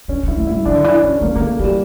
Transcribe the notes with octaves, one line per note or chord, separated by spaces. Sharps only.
C#4 D4
D4
E4
A3
E4
G3
F3 D4
D3
E3 D4
F3 C#4
A3 A#3
E3 A#3
A3
F3 G3
E3